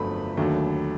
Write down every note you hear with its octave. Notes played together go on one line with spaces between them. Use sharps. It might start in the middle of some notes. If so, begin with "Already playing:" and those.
Already playing: G1 F2 D3 F#3 A3 B5
D#2 D3 F#3 A3